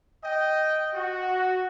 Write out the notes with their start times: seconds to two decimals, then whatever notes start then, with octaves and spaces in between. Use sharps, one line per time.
0.24 D#5 G5
0.94 F#4